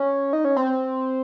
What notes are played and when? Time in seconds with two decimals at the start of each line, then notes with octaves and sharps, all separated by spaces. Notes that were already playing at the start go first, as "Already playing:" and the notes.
Already playing: C#4
0.33 D#4
0.45 C#4
0.57 C4